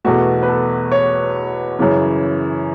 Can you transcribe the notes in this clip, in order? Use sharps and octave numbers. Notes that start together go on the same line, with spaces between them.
E2 B2 A3 F#4
B4
A4
C#5
F#2 C#3 E3